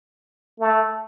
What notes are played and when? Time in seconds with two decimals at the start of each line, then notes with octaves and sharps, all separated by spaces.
0.60 A3